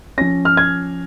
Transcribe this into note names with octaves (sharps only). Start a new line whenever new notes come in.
F3 C#4 A#6
F6
G#6